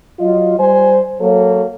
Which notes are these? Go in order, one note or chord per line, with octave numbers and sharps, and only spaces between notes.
F#3 F4 D#5
G3 C5 G#5
F#3 A#3 F#4 A4 C#5